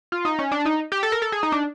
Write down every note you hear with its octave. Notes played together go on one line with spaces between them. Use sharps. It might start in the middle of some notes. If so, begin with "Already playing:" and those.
F4
D#4
C#4
D4
D#4
G4
A4
A#4
A4
G#4
D#4
D4